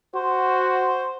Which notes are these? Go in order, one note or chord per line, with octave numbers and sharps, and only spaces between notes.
F#4 C5